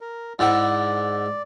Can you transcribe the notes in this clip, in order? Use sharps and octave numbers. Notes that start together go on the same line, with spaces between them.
A#4
G#2 E4 D5 F#5